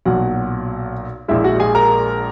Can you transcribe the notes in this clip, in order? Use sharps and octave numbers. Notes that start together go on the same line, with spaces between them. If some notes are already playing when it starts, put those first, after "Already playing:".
B1 A#2 F#3 F#4 F#5
A#1 A#2 G#3 E4 E5
F#4 F#5
G#4 G#5
A#4 A#5